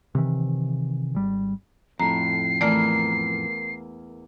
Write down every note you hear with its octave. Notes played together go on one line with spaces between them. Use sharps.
C3 D#3 E3
G#1 G3
F2 A2 A#5 C7
E2 A3 A#3 A#4 D5